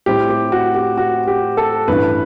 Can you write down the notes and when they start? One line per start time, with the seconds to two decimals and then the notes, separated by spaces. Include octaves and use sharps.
0.06 A2 G3 C4 E4 G4
0.29 G4
0.52 F#4
0.75 G4
0.98 F#4
1.27 G4
1.57 A4
1.88 A1 G2 E3 B4